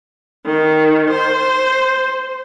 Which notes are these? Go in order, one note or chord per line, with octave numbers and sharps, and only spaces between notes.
D#3
C5